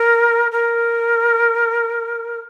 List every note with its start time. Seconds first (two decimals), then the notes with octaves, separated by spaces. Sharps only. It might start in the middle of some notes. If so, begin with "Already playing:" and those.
Already playing: A#4
0.51 A#4